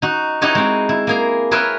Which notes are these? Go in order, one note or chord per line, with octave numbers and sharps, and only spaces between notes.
D#4 F#4
D#4 E4 F#4 G4 C#5 D#5
G#3 C4
E4
A#3 G#4 A#5
G#4 A#4 B4 C#5 E5 G5